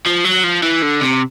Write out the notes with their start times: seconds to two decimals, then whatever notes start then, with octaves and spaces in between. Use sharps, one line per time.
0.06 F3
0.24 F#3
0.44 F3
0.63 E3
0.82 D3
1.01 C3